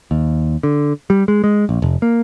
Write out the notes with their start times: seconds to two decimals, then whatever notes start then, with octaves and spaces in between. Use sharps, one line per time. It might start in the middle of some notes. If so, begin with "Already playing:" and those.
0.11 D#2
0.63 D3
1.10 G3
1.28 G#3
1.44 G#3
1.69 A#1
1.82 F1
2.02 A#3